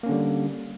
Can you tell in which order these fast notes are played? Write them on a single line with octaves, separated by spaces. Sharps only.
A#3 C#4 D3 G3